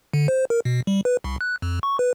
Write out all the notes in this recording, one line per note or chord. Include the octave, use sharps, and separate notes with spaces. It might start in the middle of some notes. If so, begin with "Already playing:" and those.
D3
C5
A#4
B2
G3
B4
C2
F#6
F2
C#6
B4